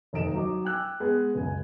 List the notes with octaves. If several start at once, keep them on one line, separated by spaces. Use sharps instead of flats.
F1 D#2 D#4 D#5 D7 E7
F#3 D#4 D#5 D6
G5 G#5 D6 E6 F#6
G#3 B3 G#4
F#1 C#2 G#5